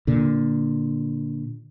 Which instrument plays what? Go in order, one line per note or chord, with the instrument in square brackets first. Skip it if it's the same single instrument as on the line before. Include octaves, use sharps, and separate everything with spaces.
[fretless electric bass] A#2 D3